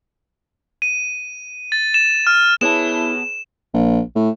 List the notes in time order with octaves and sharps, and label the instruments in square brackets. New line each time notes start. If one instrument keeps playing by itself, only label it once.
[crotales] D#7
A6
E7
F6
[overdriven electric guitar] B3 A5 [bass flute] E4 [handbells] G#4 B4 C#5 [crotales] E7
[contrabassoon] A#1
A2